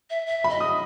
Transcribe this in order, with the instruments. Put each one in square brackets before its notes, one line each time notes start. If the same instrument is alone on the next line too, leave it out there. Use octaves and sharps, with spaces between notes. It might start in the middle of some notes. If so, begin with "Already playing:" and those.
[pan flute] E5
E5
[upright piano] B5
[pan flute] D#5
[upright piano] D#6